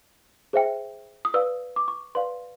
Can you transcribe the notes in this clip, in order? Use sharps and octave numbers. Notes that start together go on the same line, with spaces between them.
G#4 C5 E5 G5
D#6
B4 D5 F5 E6
D6
C#6
B4 D5 F5 C6